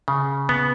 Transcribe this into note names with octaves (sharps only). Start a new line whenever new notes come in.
C#3
B3